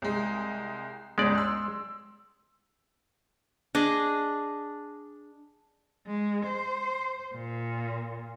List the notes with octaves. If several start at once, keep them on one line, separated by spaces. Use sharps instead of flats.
C2 G#3
G1 C#2 G#3 D5
C6 E6
D4 G#4 D#5
G#3
C5
A#2